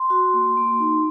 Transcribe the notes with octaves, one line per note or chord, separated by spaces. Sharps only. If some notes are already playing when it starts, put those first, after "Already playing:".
Already playing: C6
F#4
A#3
A#3
D#4